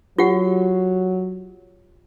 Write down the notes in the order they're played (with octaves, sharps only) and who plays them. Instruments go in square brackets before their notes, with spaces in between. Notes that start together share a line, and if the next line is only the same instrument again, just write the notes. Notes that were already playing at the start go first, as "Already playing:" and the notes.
[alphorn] F#3 [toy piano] F4 G4 F#5